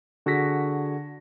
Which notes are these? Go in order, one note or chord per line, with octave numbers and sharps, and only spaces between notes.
D3 F#4 G#4 A#6 B6